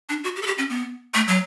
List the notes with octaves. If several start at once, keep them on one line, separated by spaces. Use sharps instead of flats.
D4
F#4
G4
A4
G4
C#4
B3
A3
F#3